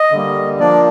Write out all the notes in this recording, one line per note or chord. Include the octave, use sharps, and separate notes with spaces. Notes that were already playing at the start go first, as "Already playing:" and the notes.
Already playing: D#5
D3 G3 A#3
F3 A#3 D4 D5